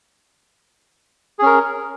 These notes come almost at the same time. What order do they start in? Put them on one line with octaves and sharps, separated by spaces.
G#4 C#4 A#4